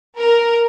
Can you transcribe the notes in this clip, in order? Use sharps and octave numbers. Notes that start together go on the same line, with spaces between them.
A#4